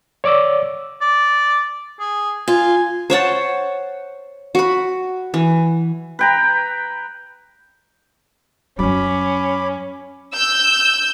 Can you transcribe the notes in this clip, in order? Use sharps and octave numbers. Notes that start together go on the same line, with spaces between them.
C#5 D5 D6 E6
D5
G#4
F4 G#5
C5 C#5 F#5 A5
F#4 B5
E3
B4 G5 A#5
F#2 F#3 C#4 B5 D6
E6 G6